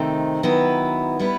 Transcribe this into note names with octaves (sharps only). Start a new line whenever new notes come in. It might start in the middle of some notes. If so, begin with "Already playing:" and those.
Already playing: C3 D#3 A3 C4 D#4
D#3 F#3 B3 E4 B4
G3 B3 E4 B4